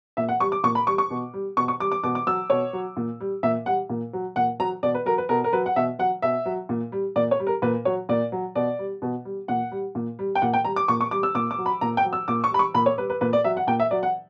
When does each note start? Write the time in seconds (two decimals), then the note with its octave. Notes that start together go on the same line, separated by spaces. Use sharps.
0.17 A#2 E5
0.28 F#5
0.40 G3 C#6
0.52 D6
0.64 A#2 C#6
0.75 B5
0.87 G3 C#6
0.98 C#6
1.10 B2
1.34 G3
1.57 B2 C#6
1.68 C#6
1.80 G3 D6
1.92 D6
2.04 B2 D6
2.15 D6
2.27 F#3 E6
2.50 B2 C#5
2.73 F#3
2.97 A#2
3.20 G3
3.43 A#2 E5
3.66 G3 F#5
3.90 A#2
4.13 F#3
4.36 A#2 F#5
4.60 F#3 A#5
4.83 B2 D5
4.94 B4
5.06 F#3 A#4
5.18 B4
5.29 B2 A#4
5.44 A#4
5.53 F#3 B4
5.66 F#5
5.76 B2 E5
5.99 F#3 F#5
6.22 B2 E5
6.45 F#3
6.69 A#2
6.92 G3
7.16 A#2 D5
7.31 C#5
7.40 G3
7.47 A#4
7.62 A#2 B4
7.85 F#3 C#5
8.09 A#2 D5
8.32 F#3
8.55 B2 D5
8.79 G3
9.02 B2
9.25 G3
9.48 A#2 F#5
9.71 G3
9.95 A#2
10.19 G3
10.35 G5
10.42 A#2 F#5
10.53 G5
10.65 G3 A#5
10.76 D6
10.88 A#2 C#6
11.01 C#6
11.11 G3 D6
11.23 E6
11.35 A#2 D6
11.51 D6
11.58 F#3
11.66 B5
11.81 A#2 A#5
11.97 G5
12.05 F#3
12.13 E6
12.28 A#2 D6
12.44 C#6
12.51 G3 B5
12.59 C#6
12.74 A#2 B5
12.86 C#5
12.98 G3 B4
13.10 B4
13.21 A#2 B4
13.33 D5
13.44 F#3 E5
13.57 F#5
13.67 A#2 G5
13.80 E5
13.91 F#3 D5
14.03 F#5